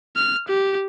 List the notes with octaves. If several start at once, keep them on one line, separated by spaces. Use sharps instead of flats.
F6
G4